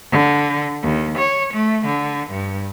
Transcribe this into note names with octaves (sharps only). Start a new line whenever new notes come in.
D3
D#2
C#5
A3
D3
G2